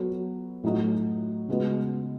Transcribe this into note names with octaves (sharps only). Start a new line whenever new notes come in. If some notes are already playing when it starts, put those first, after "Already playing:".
Already playing: F#3 B3 F#4 A4 C#5
A2 F#3 A3 D#4 F#4
C#3 G#3 B3 F#4